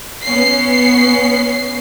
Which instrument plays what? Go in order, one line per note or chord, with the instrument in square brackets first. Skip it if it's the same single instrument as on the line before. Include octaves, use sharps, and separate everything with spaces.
[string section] B3 C#4 C7